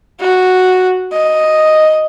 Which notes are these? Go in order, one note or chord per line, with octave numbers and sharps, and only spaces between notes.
F#4
D#5